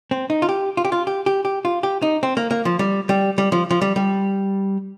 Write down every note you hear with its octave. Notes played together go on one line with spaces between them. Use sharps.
C4
D#4
F4
G4
F4
G4
F4
G4
G4
G4
F4
G4
D#4
C4
A#3
A#3
F3
G3
G3
G3
F3
F3
G3
G3